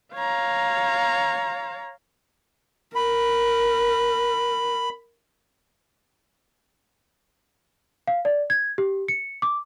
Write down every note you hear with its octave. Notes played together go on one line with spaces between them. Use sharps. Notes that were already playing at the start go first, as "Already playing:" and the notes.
C#5 F5 A#5
A#4 B5
F5
D5
G#6
G4
C#7
D6